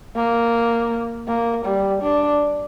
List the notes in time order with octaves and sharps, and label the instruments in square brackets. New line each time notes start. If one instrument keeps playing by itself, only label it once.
[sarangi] A#3
A#3
G3
D4